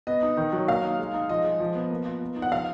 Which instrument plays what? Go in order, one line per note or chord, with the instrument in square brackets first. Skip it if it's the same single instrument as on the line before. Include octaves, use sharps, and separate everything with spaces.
[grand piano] B3 [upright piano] D#5
[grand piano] D#4
D#3
F#3
[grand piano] A#3 [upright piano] F5
[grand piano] D#4
G#3
D#4
[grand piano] F3 [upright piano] D#5
[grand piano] G#3
F3
B3
A#3
F4
B3
D#4
[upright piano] F#5
[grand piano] F3 [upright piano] F5